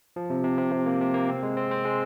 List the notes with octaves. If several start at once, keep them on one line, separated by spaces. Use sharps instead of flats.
F3
C3
C3
C3
C3
A#3
C3
A#3
C4
G#3
C4
C4
G#3